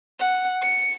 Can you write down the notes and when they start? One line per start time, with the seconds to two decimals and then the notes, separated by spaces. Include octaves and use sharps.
0.20 F#5
0.63 C#7